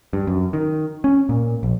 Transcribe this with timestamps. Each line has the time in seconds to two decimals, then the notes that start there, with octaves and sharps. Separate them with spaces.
0.13 G2
0.27 F#2
0.53 D#3
1.04 C#4
1.29 A#2
1.63 A#1